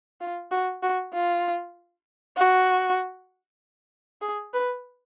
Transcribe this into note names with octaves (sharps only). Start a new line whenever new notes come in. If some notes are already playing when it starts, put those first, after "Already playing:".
F4
F#4
F#4
F4
F#4
G#4
B4